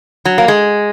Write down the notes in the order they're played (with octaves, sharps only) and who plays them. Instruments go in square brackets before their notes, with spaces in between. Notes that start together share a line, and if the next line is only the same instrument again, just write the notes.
[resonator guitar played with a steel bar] F#3
A#3
G#3